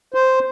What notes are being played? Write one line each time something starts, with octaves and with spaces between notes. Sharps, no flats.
C5